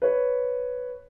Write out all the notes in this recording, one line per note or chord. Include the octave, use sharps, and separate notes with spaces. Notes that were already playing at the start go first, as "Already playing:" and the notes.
B4 C#5